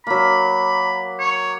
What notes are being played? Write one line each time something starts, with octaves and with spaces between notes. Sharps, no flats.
F#3 A#3 B5
C#5